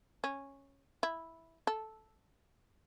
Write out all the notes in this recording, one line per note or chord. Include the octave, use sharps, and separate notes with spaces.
C#4
E4
A4